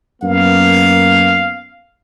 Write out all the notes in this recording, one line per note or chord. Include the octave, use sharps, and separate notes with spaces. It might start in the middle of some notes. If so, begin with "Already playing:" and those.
F#2 A#3 B3 F5